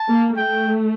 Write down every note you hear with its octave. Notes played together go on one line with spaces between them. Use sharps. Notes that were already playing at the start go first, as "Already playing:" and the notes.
Already playing: A5
A#3
A3 G5